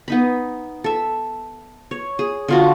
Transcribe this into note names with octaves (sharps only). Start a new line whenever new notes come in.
B3 D#4 B5
A4 E5
C#5
G#4
D3 F4 F#4